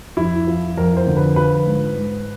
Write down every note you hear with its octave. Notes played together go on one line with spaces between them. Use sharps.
F2 E4
F3
F2 A#4
C5
D3
B4
F3 B4
G#2
G#2